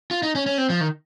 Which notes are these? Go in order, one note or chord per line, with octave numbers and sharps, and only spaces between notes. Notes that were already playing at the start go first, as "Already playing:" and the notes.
F4
D#4
C#4
C#4
C4
F3
D#3